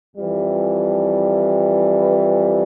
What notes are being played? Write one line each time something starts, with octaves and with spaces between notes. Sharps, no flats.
F2 E3 G3
B4